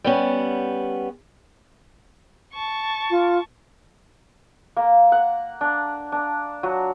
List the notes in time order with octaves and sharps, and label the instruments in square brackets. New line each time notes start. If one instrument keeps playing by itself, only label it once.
[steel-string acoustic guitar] G3 B3 C#4
[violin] A5 C#6
[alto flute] F4
[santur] A#3
F#5
D4
D4
F#3